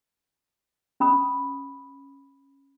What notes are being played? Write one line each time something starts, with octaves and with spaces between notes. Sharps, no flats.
C#4 B5 D#6